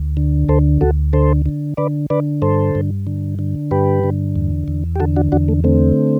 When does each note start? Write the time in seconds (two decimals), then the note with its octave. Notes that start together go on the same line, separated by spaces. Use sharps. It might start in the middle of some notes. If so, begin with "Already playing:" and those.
Already playing: D2
0.17 D3
0.49 D2 A4 C5
0.81 D2 F#4 A4
1.13 D3 A4 C5
1.46 D3
1.77 D3 B4 D5
2.10 D3 B4 D5
2.42 G2 A4 C5
2.75 G2
3.07 D3
3.39 D3
3.71 G2 G4 B4
4.04 D3
4.35 E2
4.68 E2
4.96 G4
5.00 D3 F#4 A4
5.16 D4 F#4
5.32 E2 D4 F#4
5.48 A3
5.64 D3 A3 C4